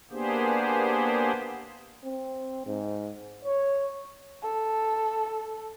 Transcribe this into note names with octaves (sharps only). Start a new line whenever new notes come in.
A#3 B3 D4 G4 G#4 C5
C4
G#2
C#5
A4